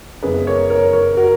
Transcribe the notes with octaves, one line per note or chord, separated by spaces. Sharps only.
F#2 C#3 G#3 B3 G#4 B4
A#4 C#5
A#4 C#5
A#4 C#5
F#4 A#4